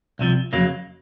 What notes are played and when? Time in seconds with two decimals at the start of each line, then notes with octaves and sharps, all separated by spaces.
0.19 C2 C3 F3
0.53 F2 C#3 F#3 A#3